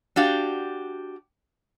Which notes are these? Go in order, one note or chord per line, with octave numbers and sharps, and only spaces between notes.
D4 F#4 G4 F5